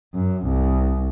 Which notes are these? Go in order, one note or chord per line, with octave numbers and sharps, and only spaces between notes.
F#2
C2